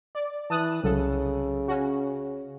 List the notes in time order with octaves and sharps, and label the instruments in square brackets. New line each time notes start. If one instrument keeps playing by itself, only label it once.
[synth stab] D5
[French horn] E3 [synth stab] A5 D#6 F#6
[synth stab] C2 F#3 A4 [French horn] C#3
[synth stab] C#4 F#4